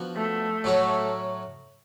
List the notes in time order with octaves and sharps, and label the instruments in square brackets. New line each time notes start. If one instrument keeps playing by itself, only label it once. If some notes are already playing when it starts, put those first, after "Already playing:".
Already playing: [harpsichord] F3 B3 D4 F#4
[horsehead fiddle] A3
[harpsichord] A2 F#3 C#4 F#4